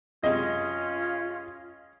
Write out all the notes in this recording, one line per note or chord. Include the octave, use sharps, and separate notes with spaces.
F#2 C3 G#3 C#4 F4 D#5